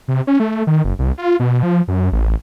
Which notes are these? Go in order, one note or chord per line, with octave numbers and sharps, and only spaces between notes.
C3
C#4
A3
D#3
F#1
C2
F4
B2
F3
F#2
A1